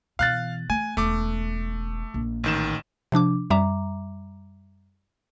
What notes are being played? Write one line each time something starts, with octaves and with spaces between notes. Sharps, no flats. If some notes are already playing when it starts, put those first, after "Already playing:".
B2 E3 F5 F#6 A6
A3 G#5
E1 A3 D6
A#1
A1 D#3 E7
C3 F3 D4 D6
F#2 G3 E5 A#5 D6